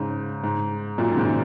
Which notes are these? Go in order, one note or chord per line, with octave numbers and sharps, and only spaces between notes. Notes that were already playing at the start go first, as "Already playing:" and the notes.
Already playing: G#2 C#3
G#2
F#2 A#2
D#3
G#2 C#3